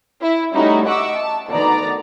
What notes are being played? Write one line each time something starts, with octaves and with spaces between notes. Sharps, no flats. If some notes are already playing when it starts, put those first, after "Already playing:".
E4
G3 A3 C#4 D#4 E4 F#4
D#5 E5 F#5 C#6 D6 E6
A5
D2 D#3 B3 D5 A#5